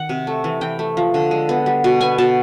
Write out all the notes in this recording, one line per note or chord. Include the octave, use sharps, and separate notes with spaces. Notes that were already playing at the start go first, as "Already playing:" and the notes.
Already playing: D#3 F#5
C3
A3
E3
E3 G5
A3
F3
D3
G#3
B3
G3
B2
B3 G#5
B2 A5